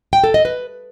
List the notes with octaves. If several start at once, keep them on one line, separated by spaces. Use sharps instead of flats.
G5
A4
D#5
B4